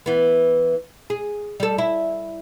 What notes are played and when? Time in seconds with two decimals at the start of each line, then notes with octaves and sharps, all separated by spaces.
0.06 E3 B3
1.10 G#4
1.60 G3 A4
1.78 E4